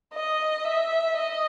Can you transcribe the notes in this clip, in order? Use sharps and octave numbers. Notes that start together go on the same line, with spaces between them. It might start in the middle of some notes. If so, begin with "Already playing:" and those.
D#5
E5
D#5